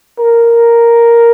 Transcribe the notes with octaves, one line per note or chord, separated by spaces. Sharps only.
A#4